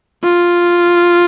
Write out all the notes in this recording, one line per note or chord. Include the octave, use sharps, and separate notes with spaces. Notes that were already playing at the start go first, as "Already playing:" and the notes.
F4